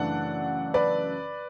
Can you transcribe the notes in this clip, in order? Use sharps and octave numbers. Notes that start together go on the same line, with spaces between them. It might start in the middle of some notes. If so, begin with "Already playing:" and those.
Already playing: F#2 C#3 E3 A3 D4 D5 F#5
B4 D5